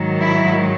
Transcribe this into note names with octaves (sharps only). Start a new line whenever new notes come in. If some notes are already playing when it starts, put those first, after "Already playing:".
Already playing: G#2 D#3 F#3
E4